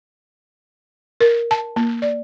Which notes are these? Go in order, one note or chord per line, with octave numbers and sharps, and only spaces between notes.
A#4
A5
A#3
D5